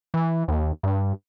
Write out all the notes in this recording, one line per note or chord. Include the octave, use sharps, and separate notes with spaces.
E3
D#2
G2